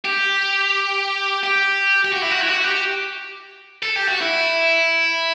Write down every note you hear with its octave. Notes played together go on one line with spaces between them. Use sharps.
G4
G4
G4
F#4
E4
F#4
E4
F#4
G4
A4
G4
F#4
E4